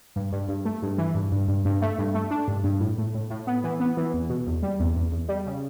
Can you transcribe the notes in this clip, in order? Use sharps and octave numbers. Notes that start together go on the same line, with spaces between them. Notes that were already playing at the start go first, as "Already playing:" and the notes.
G2
G2
G2
A3
G2
E3
G2
G2
G2
G2
A3
G2
A3
D4
G2
G2
A2
A2
A2
A2
B3
E3
B3
E3
E2
B2
E2
G3
E2
E2
E2
G3
C#3